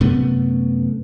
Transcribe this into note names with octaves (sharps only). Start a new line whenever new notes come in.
F#2 C3 A3 B3